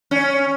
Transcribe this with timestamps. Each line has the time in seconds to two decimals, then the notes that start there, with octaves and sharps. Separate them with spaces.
0.11 C#4